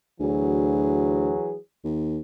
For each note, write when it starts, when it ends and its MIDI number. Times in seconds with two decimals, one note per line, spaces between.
0.20 1.32 38
0.20 1.56 52
0.20 1.56 54
0.20 1.56 68
1.84 2.20 39